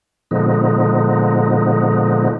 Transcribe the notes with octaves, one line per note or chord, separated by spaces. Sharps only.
A#2 D3 F3 G#3 B3 D#4